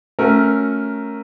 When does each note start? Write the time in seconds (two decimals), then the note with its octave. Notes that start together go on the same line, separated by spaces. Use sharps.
0.19 A3 C#4 F#4 A#4